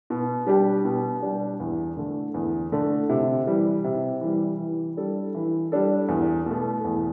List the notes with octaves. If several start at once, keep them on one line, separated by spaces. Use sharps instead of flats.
B2
G3 D4 G4
B2
G3 D4 G4
E2
D3 A3
E2
D3 A3
C3
E3 G3
C3
E3 G3
E3
G3 D4 A4
E3
G3 D4 A4
E2
B2 A3
E2